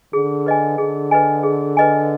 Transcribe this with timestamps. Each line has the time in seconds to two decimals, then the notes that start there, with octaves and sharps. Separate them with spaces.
0.13 D3 G#4
0.46 B4 D#5 G#5
0.78 D3 G#4
1.11 B4 D#5 G#5
1.43 G#4
1.77 B4 D#5 G#5